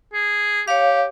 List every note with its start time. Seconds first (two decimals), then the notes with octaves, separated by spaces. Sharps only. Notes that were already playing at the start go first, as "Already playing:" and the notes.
0.14 G#4
0.68 G4 C#5 F5